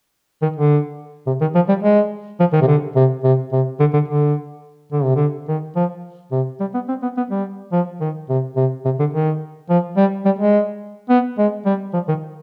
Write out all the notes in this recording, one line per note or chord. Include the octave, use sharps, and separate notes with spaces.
D#3
D3
C3
D#3
F3
G3
G#3
F3
D#3
C3
D3
C3
C3
C3
D3
D3
D3
D3
C3
D3
D#3
F3
C3
G3
B3
C4
B3
B3
G3
F3
D#3
C3
C3
C3
D3
D#3
F3
G3
G3
G#3
B3
G#3
G3
F3
D#3